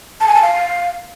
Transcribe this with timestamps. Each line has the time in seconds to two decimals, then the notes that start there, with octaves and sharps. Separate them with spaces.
0.21 A5
0.28 G#5
0.35 A5
0.42 F5